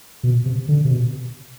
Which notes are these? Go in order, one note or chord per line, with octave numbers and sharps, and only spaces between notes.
B2
C3
D3
C3
B2